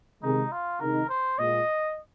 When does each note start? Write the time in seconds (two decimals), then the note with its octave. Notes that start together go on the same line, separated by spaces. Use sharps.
0.22 C3 D#3 G#3 D#4
0.52 F4
0.80 C3 D#3 G#3 D#4 A#4
1.09 C5
1.38 A#2 G#3 F4 D#5